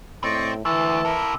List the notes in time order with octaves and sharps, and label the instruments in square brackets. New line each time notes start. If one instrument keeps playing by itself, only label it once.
[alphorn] A2 [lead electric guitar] C4 [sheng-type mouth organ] D5 D#5 C#6
[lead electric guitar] D2 [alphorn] E3 [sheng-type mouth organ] A5 [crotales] E6
[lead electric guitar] C3 A4 [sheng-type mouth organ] E4 A#4